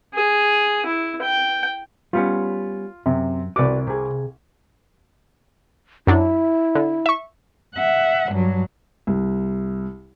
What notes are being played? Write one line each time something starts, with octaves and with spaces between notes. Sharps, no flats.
G#4
E4
G5
G3 B3 C#4 F4
F#2 C3
C2 F#4 B4 D5 D6
C3 G#4
F#2 F#3 D4 E4
D3
E5 C#6
E5 F#5
G2 F#3
C2